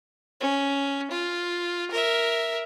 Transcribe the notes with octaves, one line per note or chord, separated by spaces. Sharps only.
C#4
F4
A#4 E5